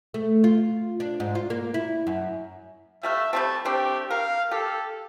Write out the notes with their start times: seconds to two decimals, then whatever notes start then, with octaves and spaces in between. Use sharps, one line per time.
0.14 A3
0.44 F4
1.00 D4
1.20 G#2
1.35 F4
1.50 A#3
1.74 E4
2.07 F#2
3.03 G3 A3 E5 F5
3.33 G3 A3 C4 A5
3.65 A3 C4 D4 G4
4.11 A#4 F5
4.51 G4 A4